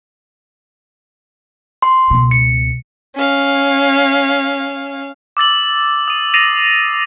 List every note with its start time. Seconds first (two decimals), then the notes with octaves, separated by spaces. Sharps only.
1.82 C6
2.11 C#2 B2
2.31 C#7
3.15 C#4 F5
5.37 D6 E6 A6 F#7
6.08 D#6 D#7
6.34 A6 A#6 C7 D#7 F7